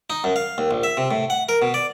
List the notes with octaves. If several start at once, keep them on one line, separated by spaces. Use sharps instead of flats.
D#4
F#2
F5
D#2
A#1
E5
C3
A2
F#5
A#4
B2
D5